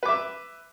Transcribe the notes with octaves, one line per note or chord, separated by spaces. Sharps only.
B4 E5 D6